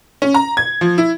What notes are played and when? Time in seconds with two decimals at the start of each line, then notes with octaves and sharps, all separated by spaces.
0.22 C#4
0.34 A#5
0.57 G#6
0.81 F3
0.98 E4